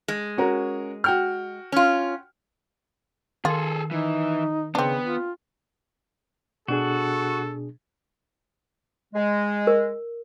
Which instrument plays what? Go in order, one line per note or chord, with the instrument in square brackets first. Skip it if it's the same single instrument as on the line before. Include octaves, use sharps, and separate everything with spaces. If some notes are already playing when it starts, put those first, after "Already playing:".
[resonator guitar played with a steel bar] G#3
[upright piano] C#4 F#4 A#4
F#4 G5 F6
[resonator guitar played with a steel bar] C#4 F4
[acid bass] D#3 [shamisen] F4 [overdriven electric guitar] G#4 A4
[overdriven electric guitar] E3 [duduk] D#4
[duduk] C#3 [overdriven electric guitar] B3 [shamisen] C4 D4
[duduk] F4
[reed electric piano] B2 D4 G#4 [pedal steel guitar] F#4 [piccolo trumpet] A4
[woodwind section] G#3
[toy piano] A#4